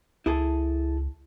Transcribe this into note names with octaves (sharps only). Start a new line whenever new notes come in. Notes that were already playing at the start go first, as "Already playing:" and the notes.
C#2 E4 G#4 A4